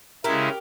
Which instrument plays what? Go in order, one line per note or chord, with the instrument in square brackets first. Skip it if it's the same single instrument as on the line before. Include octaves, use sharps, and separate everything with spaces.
[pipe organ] C#3 G#3 C#4 E4 [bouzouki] G4 A#4